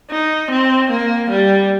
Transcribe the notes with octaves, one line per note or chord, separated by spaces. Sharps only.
D#4
C4
A#3
G3